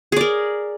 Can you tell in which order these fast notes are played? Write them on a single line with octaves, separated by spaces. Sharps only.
G#4 D5 A#4